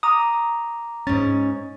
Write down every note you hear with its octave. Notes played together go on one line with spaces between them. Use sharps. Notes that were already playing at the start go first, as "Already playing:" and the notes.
A#5 D6 D#6
G#2 C#4 A6